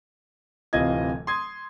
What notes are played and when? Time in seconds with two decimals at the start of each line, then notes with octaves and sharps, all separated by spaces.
0.73 D1 C3 E3 F4 D#5 G#6
1.27 C6 D#6 G#6